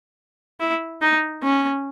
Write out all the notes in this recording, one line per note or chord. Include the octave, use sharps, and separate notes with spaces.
E4
D#4
C#4